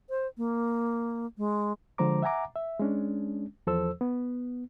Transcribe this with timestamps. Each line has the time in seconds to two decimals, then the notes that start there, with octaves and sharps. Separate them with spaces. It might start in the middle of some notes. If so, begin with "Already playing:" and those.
0.10 C5
0.38 A#3
1.38 G#3
1.98 D3 F3 G#3 C5 A#5 D6
2.22 E5 F#5 G#5 A#5 D6
2.56 E5
2.79 G#3 C#4 D4
3.67 E2 F3 A4 C5 E6
4.01 B3